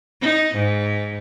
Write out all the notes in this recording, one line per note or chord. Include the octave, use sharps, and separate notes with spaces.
D#4
G#2